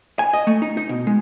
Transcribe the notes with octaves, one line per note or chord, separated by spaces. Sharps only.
G#5
D#5
A3
D#4
D#4
B2
G#3